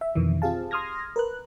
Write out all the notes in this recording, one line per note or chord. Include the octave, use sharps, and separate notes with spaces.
E5
F2 B2 D#3 E3
C4 F4 G4 G#4 F5 A5
C6 D#6 F6 G#6 A#6
A#4 B4 F#6